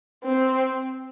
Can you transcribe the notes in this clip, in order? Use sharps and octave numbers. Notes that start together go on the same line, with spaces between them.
C4